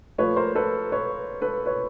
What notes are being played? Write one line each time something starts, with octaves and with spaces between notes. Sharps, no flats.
A#2 F3 A3 B4 C#5
A#4 C5
A4 B4
B4 C#5
A4 B4
B4 C#5